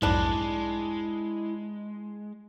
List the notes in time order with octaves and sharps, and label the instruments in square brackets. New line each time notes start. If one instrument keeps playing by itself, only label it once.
[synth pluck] B1 F2 G#2 [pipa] G3 D4 [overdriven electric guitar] G#3 [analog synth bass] E4